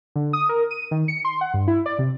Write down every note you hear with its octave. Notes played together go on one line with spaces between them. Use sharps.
D3
D#6
A#4
D#7
D#3
C#7
C6
F#5
G2
E4
D5
C3